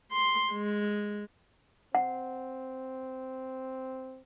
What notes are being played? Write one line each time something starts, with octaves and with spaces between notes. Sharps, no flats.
C6
G#3
C4 F#5